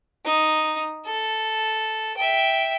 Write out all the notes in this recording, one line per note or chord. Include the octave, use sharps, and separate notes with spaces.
D#4
A4
E5 G5